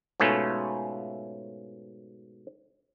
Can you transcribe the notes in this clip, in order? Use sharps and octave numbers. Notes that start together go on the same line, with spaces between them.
G#2 B2 A3 C#4 F4